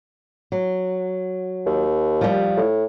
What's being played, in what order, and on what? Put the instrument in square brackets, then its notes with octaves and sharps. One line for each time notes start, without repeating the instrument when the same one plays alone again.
[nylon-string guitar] F#3
[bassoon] D#2
[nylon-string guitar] F3 G3
[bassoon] A2